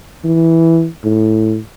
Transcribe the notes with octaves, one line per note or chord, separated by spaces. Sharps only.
E3
A2